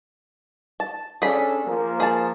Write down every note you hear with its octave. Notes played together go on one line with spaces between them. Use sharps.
A5
C#4 D4 G#4 A4 B5
F3 A#3
G#4 A5